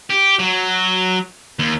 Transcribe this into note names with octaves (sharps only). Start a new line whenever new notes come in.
G4
F#3
D#2